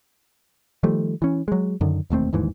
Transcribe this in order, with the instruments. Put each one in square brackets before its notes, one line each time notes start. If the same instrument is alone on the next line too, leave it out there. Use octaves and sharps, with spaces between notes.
[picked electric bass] D#3 F3 G3 A3
E3 C#4
F#3 G#3
F#2 D3 D#3
E1 D#2 A3 C4
G1 D#2 G#2 E3